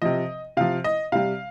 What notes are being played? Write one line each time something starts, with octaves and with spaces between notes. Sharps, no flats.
C3 F3 D#5
C3 F3 F5
D#5
C3 G3 F5